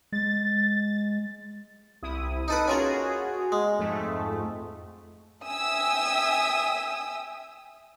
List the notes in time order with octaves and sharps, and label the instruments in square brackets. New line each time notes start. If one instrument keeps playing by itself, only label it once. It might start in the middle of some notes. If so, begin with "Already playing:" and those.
[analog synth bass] G#3 [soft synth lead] A6
[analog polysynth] C2 E4 D#6
[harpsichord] D#4 A4 B4 [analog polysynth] D#6 D7 D#7
[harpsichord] C#4 F4 A#4 [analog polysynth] F#4 G#4
[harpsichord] G#3
[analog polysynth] F2 G#2 A3
[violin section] E5 G5 G#5 D#6 E6